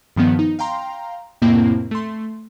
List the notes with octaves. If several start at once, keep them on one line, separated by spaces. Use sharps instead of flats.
G2 D#3 F3 B3
D#4
F5 G5 A#5 C6
F2 A2 C3 A#3 C4 E4
A3 C6